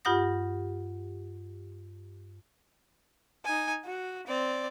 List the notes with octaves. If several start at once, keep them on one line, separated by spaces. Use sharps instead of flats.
G2 F4 G4 F#5 D#6 A#6
D#4 G#5
F#4
C4 D5